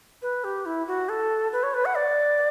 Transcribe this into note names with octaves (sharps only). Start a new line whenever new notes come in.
B4
G4
E4
F#4
A4
B4
C#5
B4
F#5
D5